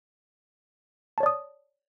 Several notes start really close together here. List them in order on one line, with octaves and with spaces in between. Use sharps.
A5 C#5 D5 D#6